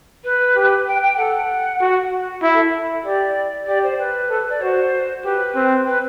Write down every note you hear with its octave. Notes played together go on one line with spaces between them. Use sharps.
B4
G4
G5
G5
A4 F#5
F#4
E4 E5
A4
G4 D5
G4 D5
C5
B4
A4
D5
F#4 C5
G4 B4
C4
B4